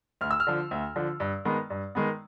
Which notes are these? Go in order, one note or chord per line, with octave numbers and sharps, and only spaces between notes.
D2 F6
E6
F6
D3 F3
D2
D3 F3
G2
D#3 G#3 B3
G2
D#3 G#3 B3